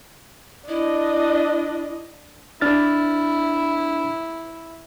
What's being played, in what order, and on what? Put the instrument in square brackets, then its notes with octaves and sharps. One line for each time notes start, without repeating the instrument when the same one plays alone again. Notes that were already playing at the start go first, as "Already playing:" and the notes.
[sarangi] D4 [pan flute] E4 [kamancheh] D#5
[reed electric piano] D4 F6 A6 [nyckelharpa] E4